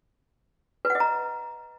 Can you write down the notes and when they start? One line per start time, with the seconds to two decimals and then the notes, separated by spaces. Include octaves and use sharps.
0.85 B4
0.90 F#5
0.95 D#5
1.00 A#5